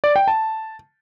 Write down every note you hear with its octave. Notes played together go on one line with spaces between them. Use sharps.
D5
G5
A5